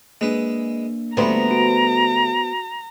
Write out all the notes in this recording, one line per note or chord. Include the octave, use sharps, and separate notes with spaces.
G#3 A#3 D4 B4
D2 G3 A3 B3 C5 A#5
F#4 D7